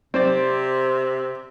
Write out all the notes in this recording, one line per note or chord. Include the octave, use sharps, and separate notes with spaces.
C3 C4 C5 D5